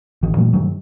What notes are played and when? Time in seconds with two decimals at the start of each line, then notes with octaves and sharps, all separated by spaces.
0.23 A1 D#3 E3
0.37 A#2 E3 F#3 A3
0.53 G2 D#3 F#3